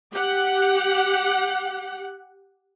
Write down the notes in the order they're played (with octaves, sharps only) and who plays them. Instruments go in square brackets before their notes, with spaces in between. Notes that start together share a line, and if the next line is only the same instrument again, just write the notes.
[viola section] G4 F#5